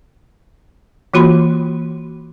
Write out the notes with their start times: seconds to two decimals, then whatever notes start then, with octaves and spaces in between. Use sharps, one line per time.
1.14 E3 A#3 F4 F#4 B5 C6